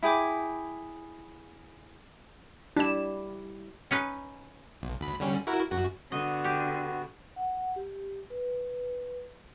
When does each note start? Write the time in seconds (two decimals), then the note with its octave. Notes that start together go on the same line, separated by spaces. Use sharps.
0.03 E4 G#4 G5 D6
2.76 G3 D4 E4 E7
3.91 C#4 D#4 B4
4.82 B1
5.01 D2 B5 B6
5.20 D3 G3 C#4
5.47 E4 F#4 A#4
5.71 F#2 F#4
6.12 D3 B3 F#4 D#5
6.45 G4
7.36 F#5
7.76 G4
8.30 B4